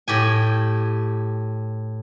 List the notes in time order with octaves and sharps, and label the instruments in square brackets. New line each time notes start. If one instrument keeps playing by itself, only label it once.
[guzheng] A2 G4 G#5